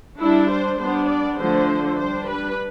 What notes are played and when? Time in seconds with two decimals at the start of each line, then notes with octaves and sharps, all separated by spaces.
0.20 G3 D4 E4
0.50 C5
0.79 G3 B3 D4 C5
1.09 D5
1.39 D3 F3 A3 D4 C5
1.98 G3 D4 C5
2.28 B4